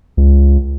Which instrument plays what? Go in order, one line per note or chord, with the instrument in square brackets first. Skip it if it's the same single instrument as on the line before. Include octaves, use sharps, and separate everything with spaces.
[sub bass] C#2